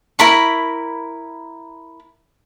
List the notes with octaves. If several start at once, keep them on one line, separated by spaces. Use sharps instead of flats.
E4 A#4 B5 C#6